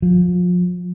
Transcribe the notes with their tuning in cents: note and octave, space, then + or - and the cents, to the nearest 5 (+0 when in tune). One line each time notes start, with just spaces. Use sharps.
F3 +35